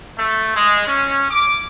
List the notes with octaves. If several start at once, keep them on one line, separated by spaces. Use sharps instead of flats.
A3
G#3
C#4
D6